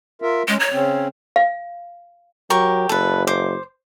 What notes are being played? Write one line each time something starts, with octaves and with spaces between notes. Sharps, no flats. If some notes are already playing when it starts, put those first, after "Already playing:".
F4 A#4 E5
G#3 C#4
C#5 A#5
C#3 C4 C#4
F5
F#3 G4 A#4 C#6
F#1 A4 B4
C5 D6